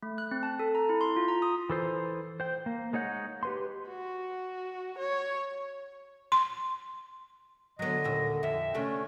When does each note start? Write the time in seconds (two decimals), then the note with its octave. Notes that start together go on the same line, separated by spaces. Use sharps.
0.03 A3
0.18 F#6
0.31 C4
0.43 A5
0.59 A4
0.75 A#5
0.89 E4
1.01 C6
1.16 F4
1.28 A#5
1.42 D#6
1.70 E3 A4 C5
2.40 C5 G5
2.66 A#3
2.93 G#3 D#4 C#5 F#5 G6
3.43 G4 B4 C6
3.88 F#4
4.98 C#5
6.32 C6
7.79 D3 F#3 B3 D#5
8.04 D#2 A#2 E5
8.43 F2 E5
8.74 C3 A3 C#4 D4